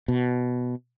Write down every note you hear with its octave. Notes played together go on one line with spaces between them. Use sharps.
B2